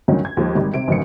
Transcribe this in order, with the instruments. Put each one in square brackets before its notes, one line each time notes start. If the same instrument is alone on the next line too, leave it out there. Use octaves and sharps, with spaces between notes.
[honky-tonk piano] D2 G2 D#3 F#3 C#4
G#6
D#2 F3 G#3
G#1 D#3 G3
C3 D7
A1 F#2 D#3 C4 C#7